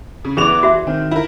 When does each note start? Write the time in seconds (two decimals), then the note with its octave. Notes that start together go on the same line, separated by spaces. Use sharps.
0.25 C#3
0.37 E3 B3 G#4 D5 E7 F7
0.63 F#4 E5
0.87 D#3 C4
1.11 E4 A#4